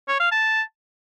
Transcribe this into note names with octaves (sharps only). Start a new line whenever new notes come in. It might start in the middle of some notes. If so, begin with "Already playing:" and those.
C#5
F5
A5